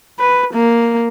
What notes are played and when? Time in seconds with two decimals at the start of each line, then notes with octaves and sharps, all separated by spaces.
0.19 B4
0.53 A#3